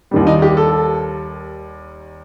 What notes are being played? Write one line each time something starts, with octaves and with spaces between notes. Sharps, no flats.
D#2 D#3 G3
D#4
G4
A4